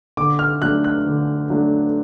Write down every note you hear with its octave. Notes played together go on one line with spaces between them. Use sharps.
D3 D6
F6
F#3 A3 D4 F#6
F#6
D3
F#3 A3 D4